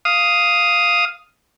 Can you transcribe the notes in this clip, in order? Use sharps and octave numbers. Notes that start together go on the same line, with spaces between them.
F5 D#6